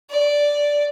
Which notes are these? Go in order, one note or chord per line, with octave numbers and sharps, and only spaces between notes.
D5